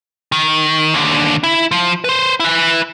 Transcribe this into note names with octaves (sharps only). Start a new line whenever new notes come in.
D#3
D#2 D3
E4
F3
B4 C5
E4 B4